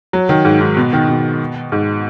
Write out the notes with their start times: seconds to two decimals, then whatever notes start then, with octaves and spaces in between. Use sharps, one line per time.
0.13 F#3
0.29 D#3
0.45 G#2
0.61 G#2
0.77 B2
0.93 D#3
1.09 B2
1.72 G#2